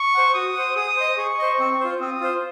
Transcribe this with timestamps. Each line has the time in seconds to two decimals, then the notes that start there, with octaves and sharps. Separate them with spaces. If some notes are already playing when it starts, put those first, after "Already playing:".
Already playing: C#6
0.14 C5 F#5
0.35 F#4 D#6
0.55 C5 F#5
0.76 G#4 D#6
0.96 C5 D#5
1.17 G#4 C#6
1.39 C5 D#5
1.59 C4
1.80 F4 C5
2.00 C4 D#6
2.21 F4 C5